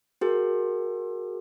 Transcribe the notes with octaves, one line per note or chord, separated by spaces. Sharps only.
F#4 G#4 A#4